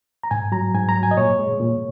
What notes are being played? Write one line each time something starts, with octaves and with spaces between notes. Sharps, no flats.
A#5
G#2 G#5
F#3 A#5
G#2 G#5
A#5
F#3
G#5
D#5
A#2 C#5
G#3
A#2